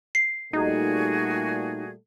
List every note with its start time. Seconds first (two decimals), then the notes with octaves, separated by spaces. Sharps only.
0.15 C7
0.53 A#2 G3 A3 D#4 F#4 G#4